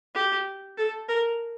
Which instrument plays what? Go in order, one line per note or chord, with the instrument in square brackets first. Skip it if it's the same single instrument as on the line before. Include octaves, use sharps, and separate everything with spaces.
[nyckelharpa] G4
A4
A#4